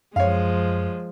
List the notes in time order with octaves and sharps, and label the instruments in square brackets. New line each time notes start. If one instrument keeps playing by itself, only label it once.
[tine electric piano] F#2 [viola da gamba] F3 G#3 [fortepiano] C#5 F5